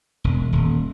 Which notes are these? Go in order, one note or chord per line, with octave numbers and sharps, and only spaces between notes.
E1
D#1